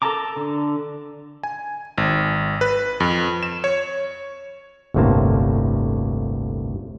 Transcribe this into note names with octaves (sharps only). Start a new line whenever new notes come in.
A4 A#4 A5 A#5 D6
D3
G#5
G#1
B4
F2
E7
C#5
G1 D2 A2 C3 A#3 A5